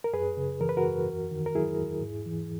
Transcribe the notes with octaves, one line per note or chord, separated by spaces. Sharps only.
A#4
F#2 G#4 B4
C#3
E3 A#4
B4
F#4 A#4
F#2
E2
D#3
A#4
F#3 E4 G#4
E2
G#2
E3